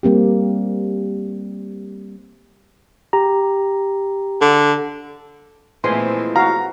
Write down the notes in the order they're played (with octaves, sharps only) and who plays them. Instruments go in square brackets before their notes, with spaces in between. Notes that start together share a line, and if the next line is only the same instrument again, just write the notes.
[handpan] G3 A#3 C4 G4
[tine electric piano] G4 A#5
[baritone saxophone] D3
[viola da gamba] A#2 A3 C4 [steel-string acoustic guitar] E3 F3 G#3 [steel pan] G#5 C6
[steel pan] F#4 F5 [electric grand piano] A#5